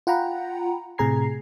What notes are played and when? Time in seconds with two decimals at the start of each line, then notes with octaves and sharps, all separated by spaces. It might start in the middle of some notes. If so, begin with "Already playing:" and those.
0.07 F4 F#5 G5 A#5 B5
0.98 A2 C3 G#4 A#5 G#6 C7